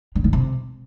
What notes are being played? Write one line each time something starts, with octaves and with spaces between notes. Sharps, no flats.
D3
D#3
C3